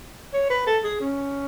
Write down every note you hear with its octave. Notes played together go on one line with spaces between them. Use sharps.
C#5
B4
A4
G#4
C#4